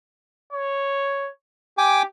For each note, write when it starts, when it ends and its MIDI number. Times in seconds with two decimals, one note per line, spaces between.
0.53 1.30 73
1.78 2.06 67
1.78 2.02 79
1.78 2.02 80
1.78 2.02 86